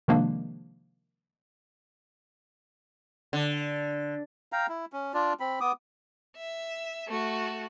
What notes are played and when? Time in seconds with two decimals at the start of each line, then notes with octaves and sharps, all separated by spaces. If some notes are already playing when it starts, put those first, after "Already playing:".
0.08 C3 D#3 F3 G#3 A#3 D4
3.33 D3
4.52 F5 G5 A#5
4.69 E4
4.93 C#4
5.14 D4 F4 D5
5.40 C4 B5
5.61 B3 D6 D#6
6.36 E5
7.08 A3 F#4